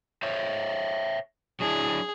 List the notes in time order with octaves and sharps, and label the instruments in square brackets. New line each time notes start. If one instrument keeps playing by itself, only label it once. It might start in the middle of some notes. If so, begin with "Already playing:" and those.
[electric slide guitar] C5 C#5 E5
[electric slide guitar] F#3 D4 E4 [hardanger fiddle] G#4